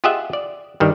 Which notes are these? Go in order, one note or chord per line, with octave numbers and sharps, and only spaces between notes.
F4 G4 G#4 D#5 E5 F#5
D5
G2 D#3 G3